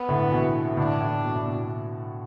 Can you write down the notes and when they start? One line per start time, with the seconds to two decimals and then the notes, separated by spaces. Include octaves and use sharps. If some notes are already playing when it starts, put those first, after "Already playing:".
Already playing: B3
0.09 A2 D3
0.32 B2 E3
0.77 A2 D3 D4
1.01 A2
1.24 B2
1.35 A2
1.45 B2